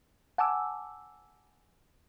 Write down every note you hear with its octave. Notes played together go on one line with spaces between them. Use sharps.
F#5 G#5 A5 D6 E6